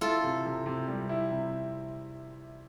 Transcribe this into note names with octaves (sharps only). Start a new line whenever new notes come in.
E4 F4 A4
C3
C3
C3
G3
E4
C3